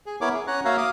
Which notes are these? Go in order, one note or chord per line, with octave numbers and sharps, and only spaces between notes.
G#4
B3 E4 A#4 C#5 D6
G#4
C#4 C#5 F#5 A#5 F#6
A#3 F#4 C#5 E5 F5 A#5
F5 D6 D#6